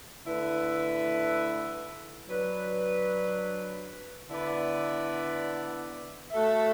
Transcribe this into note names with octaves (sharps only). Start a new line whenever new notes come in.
D3 A3 E4 B4
F#3 D4 B4
D3 B3 E4 B4 D5
A3 F#4 A4 E5